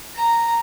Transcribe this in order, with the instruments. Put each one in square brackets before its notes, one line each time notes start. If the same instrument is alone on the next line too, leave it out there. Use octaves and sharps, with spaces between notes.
[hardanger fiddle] A#5